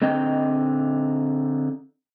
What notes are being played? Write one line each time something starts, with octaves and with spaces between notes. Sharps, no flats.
D3 C4 D#4 D#5 G5